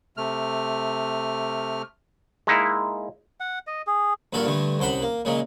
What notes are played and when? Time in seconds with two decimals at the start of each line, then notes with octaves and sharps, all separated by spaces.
0.17 C3 A3 F6
2.47 G#3 A#3 D#4 E4
3.40 F#5
3.67 D#5
3.87 G#4
4.33 G2 A#2 F#4 A4 A#4
4.46 G2 D3 A3
4.79 C2 F#2 C5 F#5 B5
5.02 A#3
5.25 A#2 C#3 F#3 G#3